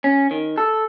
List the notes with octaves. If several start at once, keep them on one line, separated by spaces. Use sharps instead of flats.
C#4
D#3
A4